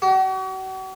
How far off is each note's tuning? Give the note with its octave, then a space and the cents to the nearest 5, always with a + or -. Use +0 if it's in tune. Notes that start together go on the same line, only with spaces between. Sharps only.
F#4 +40